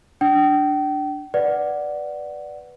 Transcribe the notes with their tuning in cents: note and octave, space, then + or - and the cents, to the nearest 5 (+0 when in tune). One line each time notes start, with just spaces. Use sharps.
D4 +0 G5 -35
B4 +0 D5 +0 F#5 +0